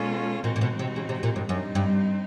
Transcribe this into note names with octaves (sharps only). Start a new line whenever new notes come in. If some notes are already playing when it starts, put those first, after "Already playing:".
Already playing: B2 G#3 C#4 F4 A4
A#2 E3 G#3 C4 D#4 F#4
A#2
B2
C3
C#3
C3
A#2
G2
F#2 G3 C4 D#4
G2